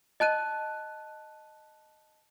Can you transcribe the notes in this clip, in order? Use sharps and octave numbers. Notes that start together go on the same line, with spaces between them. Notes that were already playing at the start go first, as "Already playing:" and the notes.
D#5 A5 F#6 D#7